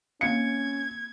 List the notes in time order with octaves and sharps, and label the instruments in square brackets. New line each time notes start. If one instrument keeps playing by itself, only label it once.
[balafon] A#3 C4 F5 [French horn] C#4 [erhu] G#6 [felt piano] C#7